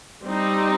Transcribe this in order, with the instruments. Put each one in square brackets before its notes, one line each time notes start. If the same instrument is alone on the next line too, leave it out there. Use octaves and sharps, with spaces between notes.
[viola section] G3 C4 D#4